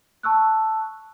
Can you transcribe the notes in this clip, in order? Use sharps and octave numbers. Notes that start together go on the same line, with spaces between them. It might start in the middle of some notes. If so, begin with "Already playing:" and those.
A5 C#6 E6 F#6